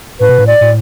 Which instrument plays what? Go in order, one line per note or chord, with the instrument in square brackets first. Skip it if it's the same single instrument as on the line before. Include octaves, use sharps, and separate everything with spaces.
[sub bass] A2 [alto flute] B4
[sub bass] B2
A2
[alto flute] D5
[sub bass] A2